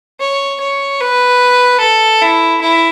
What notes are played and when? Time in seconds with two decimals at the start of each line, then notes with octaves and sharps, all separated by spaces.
0.20 C#5
0.60 C#5
1.01 B4
1.80 A4
2.22 E4
2.61 E4